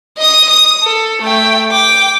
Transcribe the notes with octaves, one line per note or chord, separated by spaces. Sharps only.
D#5 D#6
D#6
A4
A3 G5
G5 D6